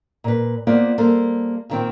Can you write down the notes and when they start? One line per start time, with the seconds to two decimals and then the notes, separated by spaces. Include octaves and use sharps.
0.24 A#2 B4
0.67 A#3 B3 F4 C5 D5
0.98 G3 A#3 A4 C5
1.70 A#2 D#3 C4